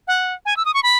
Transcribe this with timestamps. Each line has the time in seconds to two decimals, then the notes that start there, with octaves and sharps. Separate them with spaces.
0.08 F#5
0.45 G#5
0.57 E6
0.65 D#6
0.74 C#6
0.83 B5